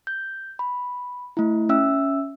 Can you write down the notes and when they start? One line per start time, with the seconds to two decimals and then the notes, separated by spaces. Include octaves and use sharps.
0.07 G6
0.59 B5
1.37 A3 E4
1.69 C#4 E5 E6